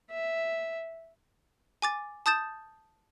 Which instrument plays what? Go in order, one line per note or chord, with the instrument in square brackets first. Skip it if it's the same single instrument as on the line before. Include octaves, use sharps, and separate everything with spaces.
[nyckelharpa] E5
[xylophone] G#5 D6 A6
A5 D#6 G6 A6 E7